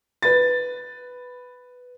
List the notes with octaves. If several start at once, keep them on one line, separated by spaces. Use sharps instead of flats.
B4 A6